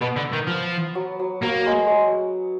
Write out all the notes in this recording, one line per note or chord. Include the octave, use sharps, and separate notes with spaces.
B2 B3
D3
D#3
F3
F#3
F#3
F#3 A#3
G#3
F#3 G#3